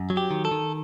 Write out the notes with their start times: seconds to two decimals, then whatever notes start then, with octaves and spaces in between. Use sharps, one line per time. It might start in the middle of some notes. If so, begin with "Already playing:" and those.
Already playing: F#2
0.10 F#3
0.17 G4
0.31 D#3
0.45 A4
0.52 D#3